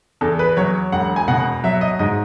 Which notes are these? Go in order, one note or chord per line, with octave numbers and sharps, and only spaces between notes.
E2 A4
B4
F#3 C#5
E1 F#5
G#5
B2 F#5
F#3 E5
D#5
G#2 D#5